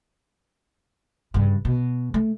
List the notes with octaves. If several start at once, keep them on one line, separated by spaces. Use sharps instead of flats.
G2 C#3
B2
A3